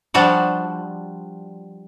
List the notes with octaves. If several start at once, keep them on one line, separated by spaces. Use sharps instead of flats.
F3 G3 D4 F#4 D5